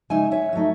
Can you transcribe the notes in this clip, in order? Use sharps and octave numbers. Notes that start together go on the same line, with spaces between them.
C#3 G#3 D#4 E5 G#5
C#5 E5
F#3 A3 D#4